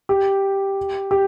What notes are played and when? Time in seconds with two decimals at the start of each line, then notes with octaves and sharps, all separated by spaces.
0.09 G4
1.11 G4